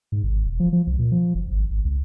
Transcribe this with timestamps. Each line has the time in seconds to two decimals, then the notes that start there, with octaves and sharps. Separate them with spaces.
0.12 G#2
0.24 G#1
0.44 E1
0.60 F3
0.73 F3
0.87 C2
0.99 A#2
1.12 F3
1.35 F#1
1.48 G#1
1.70 G#1
1.85 C#2